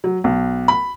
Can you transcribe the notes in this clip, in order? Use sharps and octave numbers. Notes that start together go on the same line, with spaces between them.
F#3
B1
B5